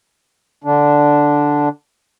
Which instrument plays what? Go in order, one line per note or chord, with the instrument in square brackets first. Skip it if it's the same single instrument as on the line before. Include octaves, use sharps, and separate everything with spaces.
[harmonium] D3 D4